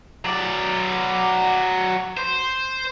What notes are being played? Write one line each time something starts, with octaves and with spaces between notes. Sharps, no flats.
F#3 D5
C5